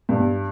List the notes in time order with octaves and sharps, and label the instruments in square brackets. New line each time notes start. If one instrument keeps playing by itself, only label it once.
[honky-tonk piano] G2